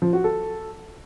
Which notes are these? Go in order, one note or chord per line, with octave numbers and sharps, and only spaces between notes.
F3
F#4
A4